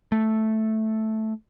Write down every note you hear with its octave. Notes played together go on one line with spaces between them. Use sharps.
A3